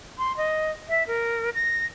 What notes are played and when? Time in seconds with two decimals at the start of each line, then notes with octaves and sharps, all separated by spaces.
0.18 C6
0.37 D#5
0.89 E5
1.07 A#4
1.54 A#6